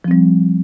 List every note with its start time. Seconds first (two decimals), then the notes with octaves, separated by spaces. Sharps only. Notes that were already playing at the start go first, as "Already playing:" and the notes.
0.04 F3
0.08 C4
0.11 G3